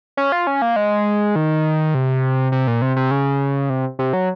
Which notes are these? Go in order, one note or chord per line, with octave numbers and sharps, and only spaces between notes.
C#4
F4
C#4
A#3
G#3
D#3
C3
C3
A#2
C3
C3
C#3
C3
C3
F#3